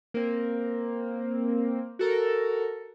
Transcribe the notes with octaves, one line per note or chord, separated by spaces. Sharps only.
A#3 C4
F#4 A4 A#4